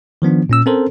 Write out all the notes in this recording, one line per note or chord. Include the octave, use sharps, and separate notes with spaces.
D#3 F3 B3 D4
A#2 C#4 E6
C4 C#4 A4 A#4 C5